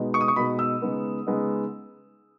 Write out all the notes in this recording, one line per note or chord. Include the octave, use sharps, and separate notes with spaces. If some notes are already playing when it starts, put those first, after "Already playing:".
Already playing: B2 G#3 B3 D#4
C#6
D#6
C#6
B2 G#3 B3 D#4 B5
E6
C#3 G#3 B3 D#4
C#3 G#3 B3 D#4